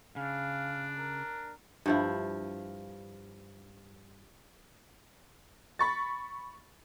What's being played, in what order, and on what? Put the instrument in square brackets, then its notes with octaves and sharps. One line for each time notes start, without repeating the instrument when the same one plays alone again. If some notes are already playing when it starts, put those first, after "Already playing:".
[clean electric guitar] C#3 [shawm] D4 [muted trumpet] F5
[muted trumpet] A#4
[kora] G2 F3 E4
[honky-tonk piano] B5 C#6 A6